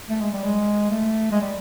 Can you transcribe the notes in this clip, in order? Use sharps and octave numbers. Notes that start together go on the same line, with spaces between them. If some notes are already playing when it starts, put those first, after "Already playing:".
A3
G#3
G3
G#3
A3
G#3
G3